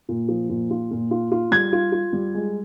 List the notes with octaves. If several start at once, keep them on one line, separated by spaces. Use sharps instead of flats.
A#2
F3
A#2
F4
A#2
F4
F4
G3 G#6
F4
F4
G3
G#3